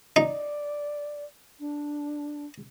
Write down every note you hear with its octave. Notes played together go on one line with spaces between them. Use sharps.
D#4 D5
D4